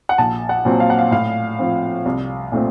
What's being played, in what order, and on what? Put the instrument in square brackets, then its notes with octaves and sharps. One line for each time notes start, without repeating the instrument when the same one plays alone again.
[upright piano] F#5
A#1 A5
F#5
A#2 F#3 C4
F5
F#5
F5
A2 F5
F3 C4
C2
A#2 A3 C4